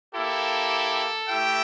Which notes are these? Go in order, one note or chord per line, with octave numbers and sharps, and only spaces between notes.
A#3 E4 G4 A4
A3 E4 G4 E5 G5